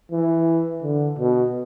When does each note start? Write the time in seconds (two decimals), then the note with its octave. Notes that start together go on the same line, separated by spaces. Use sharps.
0.11 E3
0.83 D3
1.18 B2